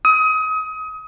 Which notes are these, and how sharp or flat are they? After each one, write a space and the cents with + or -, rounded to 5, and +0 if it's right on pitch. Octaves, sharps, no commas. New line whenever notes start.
D#6 +30